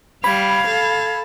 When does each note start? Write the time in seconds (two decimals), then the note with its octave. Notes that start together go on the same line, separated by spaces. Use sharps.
0.24 G3 F5 B5 G#6
0.67 A4